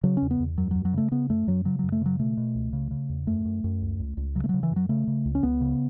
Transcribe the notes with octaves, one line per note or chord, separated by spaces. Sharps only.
C#3 F#3
E2 C#4
B3
E2
F#2 F#3
F#2 F#3
F#3
C#3 A3
C#3 B3
F#2 A3
F#2 F#3
C#3 F#3
F#2 F#3
A3
C#3 F#3
B2 A3
B2
C#2
C#3
C#3
E2
F#2 A3
F#2
F#2
C#2
C#2
C#2
C#3 F#3
A3
C#3 F#3
E3
F#2
F#3
C#3 A3
C#3
C#2
C#4
C#2 B3
C#3